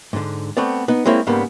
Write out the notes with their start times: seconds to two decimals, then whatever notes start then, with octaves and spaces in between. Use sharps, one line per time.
0.13 G#2 D3
0.57 A3 B3 C4 D5
0.88 B3 D#4
1.06 G#3 A#3 C4 E4 C#5
1.27 G#2 C#3 G3 A#3 B3